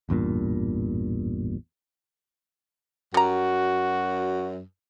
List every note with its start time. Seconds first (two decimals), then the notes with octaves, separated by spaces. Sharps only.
0.09 A1 E2 G2 A#2
3.14 F#2 G3 F#4 A#5